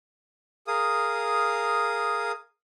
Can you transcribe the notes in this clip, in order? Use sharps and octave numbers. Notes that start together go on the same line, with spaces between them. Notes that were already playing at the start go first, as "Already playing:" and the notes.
G#4 A#4 F5 D#6